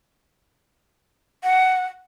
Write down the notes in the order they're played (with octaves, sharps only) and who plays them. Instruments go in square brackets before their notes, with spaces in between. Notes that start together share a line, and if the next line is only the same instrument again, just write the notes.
[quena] F#5